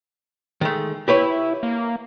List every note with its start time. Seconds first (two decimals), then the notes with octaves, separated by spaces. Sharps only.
0.61 D#3 G#3 A3
1.08 E4 G4 B4 C#5
1.63 A#3